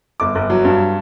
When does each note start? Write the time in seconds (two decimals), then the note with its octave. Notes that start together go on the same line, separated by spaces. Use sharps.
0.20 G1 D6
0.35 G1
0.50 F#3
0.65 G2